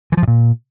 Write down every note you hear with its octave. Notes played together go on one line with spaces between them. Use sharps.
E3
F3
A2
A#2